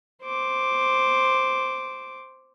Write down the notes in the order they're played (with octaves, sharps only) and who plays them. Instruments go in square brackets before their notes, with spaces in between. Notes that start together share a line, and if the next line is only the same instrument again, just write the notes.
[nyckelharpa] C5 D6